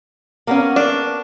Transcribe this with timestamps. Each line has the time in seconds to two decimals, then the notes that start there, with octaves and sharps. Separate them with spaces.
0.47 A#3 B3 C#4
0.76 D4